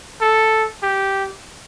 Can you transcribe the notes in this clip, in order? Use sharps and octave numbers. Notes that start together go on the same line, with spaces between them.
A4
G4